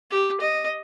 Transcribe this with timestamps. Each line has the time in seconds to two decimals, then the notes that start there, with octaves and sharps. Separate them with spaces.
0.11 G4
0.41 D#5